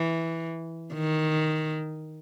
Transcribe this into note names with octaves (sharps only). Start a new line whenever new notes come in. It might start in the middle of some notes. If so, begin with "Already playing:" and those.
Already playing: E3
D#3